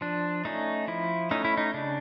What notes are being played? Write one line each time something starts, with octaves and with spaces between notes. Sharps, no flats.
F3 D4
A3 C#4 D#4
F3 E4
A3 C#4 D#4
E4
D#4
C#3 D4